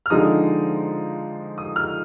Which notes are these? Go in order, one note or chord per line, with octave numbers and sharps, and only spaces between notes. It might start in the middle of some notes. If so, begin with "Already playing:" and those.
F6
D3 F3 G#3 D#4 D#6
D#6
F6